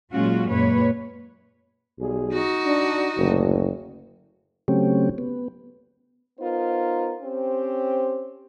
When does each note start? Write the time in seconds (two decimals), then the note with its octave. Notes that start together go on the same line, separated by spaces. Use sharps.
0.12 A#2 F#3 G#3 C#4 F4 F#4
0.49 F#2 A#2 G#3 B4 C#5
1.99 B1 G3 G#4
2.33 D#4 F#4
2.66 D4
3.17 F#1 D2 A2 D3
4.68 C#3 F#3 A3 C4 C#4 G4
5.18 B3
6.38 B3 D#4 F4 A#4 C5
7.21 C4 C#4 G4 C5